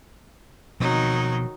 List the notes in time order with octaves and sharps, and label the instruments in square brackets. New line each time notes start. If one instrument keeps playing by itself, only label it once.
[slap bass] B2 F3 C4 [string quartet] D#3 F#3 D#4